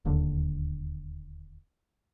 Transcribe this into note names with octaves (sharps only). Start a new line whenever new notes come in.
D1 D#2 D3